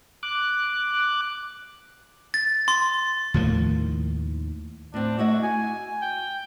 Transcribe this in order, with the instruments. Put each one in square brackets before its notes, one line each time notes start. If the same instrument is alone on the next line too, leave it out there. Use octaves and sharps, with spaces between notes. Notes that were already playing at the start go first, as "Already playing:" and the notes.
[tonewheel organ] D6 F#6
[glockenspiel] A6
C6
[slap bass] D#2 A2 D#3 F3
[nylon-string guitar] A2 C4 [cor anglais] D4
[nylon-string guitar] A3 E4 D#5 [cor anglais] F#4
[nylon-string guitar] F#4 [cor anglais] G#5
[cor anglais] G5